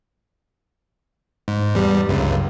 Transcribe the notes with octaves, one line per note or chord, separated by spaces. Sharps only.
G#2
E2 G3
G1 C#2 F#2